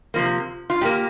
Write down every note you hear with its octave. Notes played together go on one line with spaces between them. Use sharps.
C3 F3 A#3
F4
A#2 A#3 G4